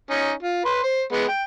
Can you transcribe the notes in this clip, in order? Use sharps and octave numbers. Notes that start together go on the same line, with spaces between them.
C#4 D#4
F4
B4 C6
C5
G#3 B3
G5